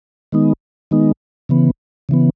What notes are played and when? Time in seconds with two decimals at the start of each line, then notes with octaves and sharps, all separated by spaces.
0.32 D#3 G#3 B3 D#4
0.91 D#3 G#3 B3 D#4
1.49 C#3 E3 B3
2.09 C#3 E3 B3